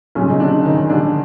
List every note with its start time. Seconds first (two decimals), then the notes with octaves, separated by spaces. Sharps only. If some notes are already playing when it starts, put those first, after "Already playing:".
0.15 B1 A#2 C#3 G3 C#4
0.30 D#4
0.40 D3 D4
0.65 D#3 D#4
0.90 B1 A#2 D3 G3 D4